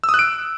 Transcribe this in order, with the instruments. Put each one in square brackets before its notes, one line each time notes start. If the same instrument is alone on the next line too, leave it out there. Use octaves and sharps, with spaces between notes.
[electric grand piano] E6
D#6
F#6
D7